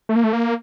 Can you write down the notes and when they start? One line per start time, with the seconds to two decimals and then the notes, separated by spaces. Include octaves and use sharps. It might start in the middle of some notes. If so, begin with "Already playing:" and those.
0.09 A3
0.16 A#3
0.24 A3
0.33 A#3